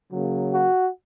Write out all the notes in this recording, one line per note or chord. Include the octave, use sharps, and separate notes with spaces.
C#3 F#3 A#3
F#4